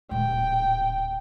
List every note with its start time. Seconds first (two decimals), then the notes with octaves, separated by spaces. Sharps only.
0.11 D1 A#2 G5